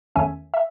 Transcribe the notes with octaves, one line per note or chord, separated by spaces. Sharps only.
E2 D#3 A3 C#4 E5 G#5
E5